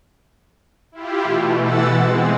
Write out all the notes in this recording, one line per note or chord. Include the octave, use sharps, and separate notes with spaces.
E4 F4 G4
B2 E3 A3
B2 E3 F#5 E6 A6
G#3 C4